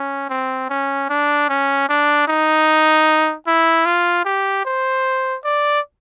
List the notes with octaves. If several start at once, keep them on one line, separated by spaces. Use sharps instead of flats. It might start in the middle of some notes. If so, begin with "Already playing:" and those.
Already playing: C#4
C4
C#4
D4
C#4
D4
D#4
E4
F4
G4
C5
D5